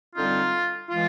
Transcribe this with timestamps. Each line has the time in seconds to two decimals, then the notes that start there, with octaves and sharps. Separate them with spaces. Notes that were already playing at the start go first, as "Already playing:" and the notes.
0.16 D3 G3 C4 D#4 F4
0.90 E3 G#3 F4